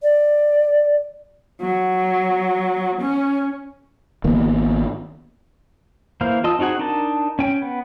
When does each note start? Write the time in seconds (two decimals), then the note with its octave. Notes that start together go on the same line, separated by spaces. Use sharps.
0.03 D5
1.62 F#3
3.01 C#4
4.24 G#1 D#3 A#3 B3
6.21 E3 A#3 C5 F5
6.44 F4 D#5 A5 D#6 E6
6.59 C4 D#4 F#4 G#4 F#5
6.79 D4 D#4 A#4 A5
7.39 C#4 G5
7.62 B3